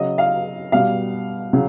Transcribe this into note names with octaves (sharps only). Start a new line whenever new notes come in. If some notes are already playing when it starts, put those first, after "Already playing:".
Already playing: C#3 F#3 D#5
F5
B2 G3 F5
C#3 F#3